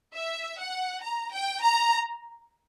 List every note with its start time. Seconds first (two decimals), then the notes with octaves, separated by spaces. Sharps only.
0.14 E5
0.58 F#5
1.03 A#5
1.33 G5
1.61 A#5